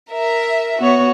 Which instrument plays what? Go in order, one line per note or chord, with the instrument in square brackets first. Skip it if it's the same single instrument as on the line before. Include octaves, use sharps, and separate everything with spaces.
[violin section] A#4 E5
[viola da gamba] B3 C#5 [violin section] F#4